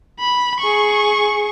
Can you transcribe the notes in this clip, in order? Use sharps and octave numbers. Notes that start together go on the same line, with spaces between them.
B5
G#4 C#6